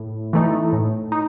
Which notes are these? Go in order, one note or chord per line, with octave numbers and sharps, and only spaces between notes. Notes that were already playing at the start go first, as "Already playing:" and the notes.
Already playing: A2
E3 A3 D#4
A2
D#4